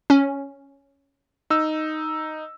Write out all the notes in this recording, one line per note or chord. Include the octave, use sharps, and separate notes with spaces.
C#4
D#4 E6